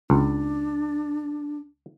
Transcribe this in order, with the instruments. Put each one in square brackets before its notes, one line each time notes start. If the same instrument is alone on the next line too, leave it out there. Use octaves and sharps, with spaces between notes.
[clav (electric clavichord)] C#2 [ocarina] D4